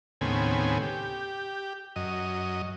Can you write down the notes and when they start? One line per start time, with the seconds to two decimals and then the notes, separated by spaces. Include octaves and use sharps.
0.21 D#2 A2 C#3 B3 C4 G#5
0.82 G4
1.96 F#2 D#5